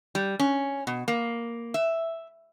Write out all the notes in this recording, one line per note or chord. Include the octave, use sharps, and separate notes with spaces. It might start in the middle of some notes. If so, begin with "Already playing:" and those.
G3
C#4
B2
A#3
E5